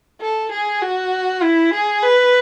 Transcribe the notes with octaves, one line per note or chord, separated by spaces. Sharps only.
A4
G#4
F#4
E4
G#4
B4